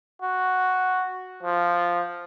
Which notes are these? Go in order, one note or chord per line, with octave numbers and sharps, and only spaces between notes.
F#4
F3